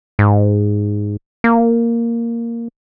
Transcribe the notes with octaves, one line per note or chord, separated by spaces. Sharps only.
G#2
A#3